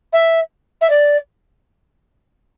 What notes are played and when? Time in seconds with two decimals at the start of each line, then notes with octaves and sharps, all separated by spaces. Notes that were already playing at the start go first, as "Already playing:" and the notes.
0.13 E5
0.81 E5
0.90 D5